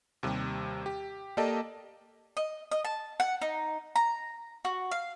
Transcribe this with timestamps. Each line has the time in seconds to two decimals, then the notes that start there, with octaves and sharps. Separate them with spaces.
0.23 D#2 C3 G3
0.86 G4
1.37 A#3 G4 A4 D5 D#5 A5
2.37 D#5
2.71 D#5
2.85 A5
3.20 F#5
3.41 D#4
3.96 A#5
4.65 F#4
4.91 F5